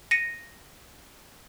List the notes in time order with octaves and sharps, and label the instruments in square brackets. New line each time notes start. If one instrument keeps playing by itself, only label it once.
[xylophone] A#6 C#7 D#7